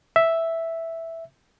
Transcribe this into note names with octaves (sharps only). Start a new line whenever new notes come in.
E5